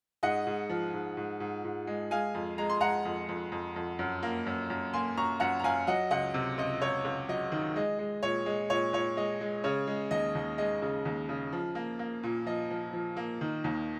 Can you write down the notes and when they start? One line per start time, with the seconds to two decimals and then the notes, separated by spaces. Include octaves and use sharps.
0.23 G#2 D#5 F#5
0.47 G#2
0.69 F3
0.94 G#2
1.17 G#2
1.40 G#2
1.65 G#2
1.87 G#3
2.11 G#3 F5 G#5
2.35 F2
2.58 G#3 A#5
2.70 C6
2.81 G#3 F#5 A#5
3.05 F2
3.29 F2
3.52 F2
3.76 F2
3.99 F#2
4.23 A#3
4.47 F#2
4.70 F#2
4.94 A#3 G#5 C6
5.17 F#2 A#5 C#6
5.40 F#2 F#5 A#5
5.60 A#5
5.64 F#2 F5 G#5
5.87 F#3 D#5 F#5
6.11 C#2 D#5 F#5
6.34 C3
6.58 C#2 D#5
6.81 C#2 C#5
7.05 C#2
7.29 F#3 D#5
7.52 D#3
7.76 G#3 D#5
7.99 G#3
8.23 A#2 C#5
8.46 G#3
8.70 A#2 C#5
8.93 A#2 C#5
9.17 G#3 D#5
9.41 G#3
9.64 C#3 C#5
9.87 G#3
10.11 D#2 D#5
10.35 D#2
10.58 G#3 D#5
10.82 C#3
11.05 D#2
11.29 C#3
11.52 F3
11.75 A#3
11.99 A#3
12.23 A#2
12.46 F3 D#5
12.70 F3
12.93 F3
13.17 A#3
13.41 D#3
13.64 D#2